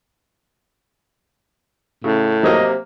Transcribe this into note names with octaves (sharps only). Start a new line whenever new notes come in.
A2 C#3
C3 F#3 A#3 D#5